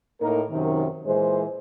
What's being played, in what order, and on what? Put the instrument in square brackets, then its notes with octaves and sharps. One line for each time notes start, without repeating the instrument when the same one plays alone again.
[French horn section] A2 A#3 D#4 A#4
F#2 C3 D#3
A#2 E3 G#3 C5